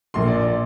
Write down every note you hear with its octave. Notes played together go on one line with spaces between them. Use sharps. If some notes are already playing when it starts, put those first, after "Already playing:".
A#1 A#2 A#3 C6
D5
D5